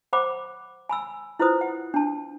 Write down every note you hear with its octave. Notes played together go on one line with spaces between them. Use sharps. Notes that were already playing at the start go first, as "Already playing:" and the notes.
C5 F#5 B5 D6
G#5 B5 E6
E4 F4 B4 C5 D#6
F#5
D4 A5